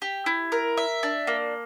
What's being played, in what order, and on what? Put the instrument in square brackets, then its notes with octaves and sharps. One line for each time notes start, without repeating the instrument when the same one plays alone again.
[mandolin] G4
E4
A#4
E5
D4
A#3